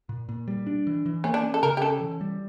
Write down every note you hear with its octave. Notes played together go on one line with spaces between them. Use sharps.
A#2
A#2
G3
D4
E3
E3
A#3 C#4
D4
C#4
A4
C#3 A#4
G4
C#4 A4
E3
G3